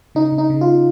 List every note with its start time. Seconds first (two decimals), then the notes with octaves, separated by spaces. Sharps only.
0.15 C#3 D#4
0.32 C#3
0.38 D#4
0.50 C#3
0.61 F4